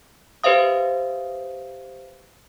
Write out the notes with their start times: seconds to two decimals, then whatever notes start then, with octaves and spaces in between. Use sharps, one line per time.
0.44 G4 B4 C5 E5 F5 D#6